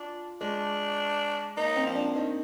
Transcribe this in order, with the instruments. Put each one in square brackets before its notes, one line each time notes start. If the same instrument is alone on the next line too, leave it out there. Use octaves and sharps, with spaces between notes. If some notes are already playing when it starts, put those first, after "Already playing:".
Already playing: [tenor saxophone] D4 [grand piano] F4
[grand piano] G#3 [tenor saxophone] D4
[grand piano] A#3 [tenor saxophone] D#4
[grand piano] C4
[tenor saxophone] F3
[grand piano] D4
[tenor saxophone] D#3 [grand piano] D#4